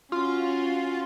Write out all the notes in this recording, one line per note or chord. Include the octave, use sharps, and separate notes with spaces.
C#4 F4 F#4